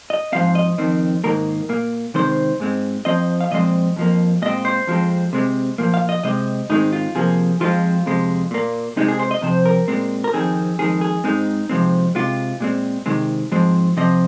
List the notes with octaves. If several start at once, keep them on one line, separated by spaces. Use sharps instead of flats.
D#5
G#2 F3 C4 F5
D#5
F2 D#3 C4
G#2 D#3 A#3 A#4
A#2 A#3
C3 D#3 G#3 C4 C5
G#2 G#3 C4
F2 F3 C4 D#5
F5
A#2 F3 G#3 C4 D#5
F2 F3 A#3
A#2 G#3 C4 D#5
C5
F2 F3 G#3 C4
C3 G#3 C4
A#2 F3 A#3
F5
D#5
C3 G#3 C4 D#5
G#2 D#3 G#3 C4 D#4
F4
C3 F3 A#3 G#4
F2 F3 G#3 C4 F4
F2 C3 G#3
A#2 A#3
C3 G#3 C4 D#4
G#4
C5
D#5
F2 C3 F3 C4 C5
A#4
A#2 G#3 C4
A#4
F2 D#3 C4 G#4
F2 D#3 G#3 G#4
G#4
G#2 G#3 C4 D#4
C3 F3 G#3 C4
C3 G#3 C4 F4
A#2 G#3 C4
C3 D#3 G#3 C4
G#2 F3 G#3 C4
C3 F3 C4 D#5